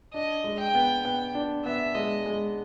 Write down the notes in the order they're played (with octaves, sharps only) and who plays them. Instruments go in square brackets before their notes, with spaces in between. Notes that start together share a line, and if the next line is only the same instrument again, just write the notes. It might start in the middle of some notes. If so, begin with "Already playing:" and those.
[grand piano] D4 [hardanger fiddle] D#5
[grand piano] G#3
[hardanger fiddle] G5
[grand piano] B3
[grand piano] B3 [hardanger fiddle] G5
[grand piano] D4
[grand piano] B3 [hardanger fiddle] E5
[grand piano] G#3 [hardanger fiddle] D#5
[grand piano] G#3